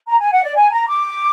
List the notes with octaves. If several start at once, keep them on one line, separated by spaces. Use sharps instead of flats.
A#5
G#5
F#5
D5
G#5
A#5
D6